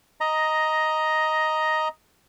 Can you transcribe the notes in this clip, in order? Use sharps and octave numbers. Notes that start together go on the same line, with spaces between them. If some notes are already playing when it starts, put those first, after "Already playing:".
D#5 A#5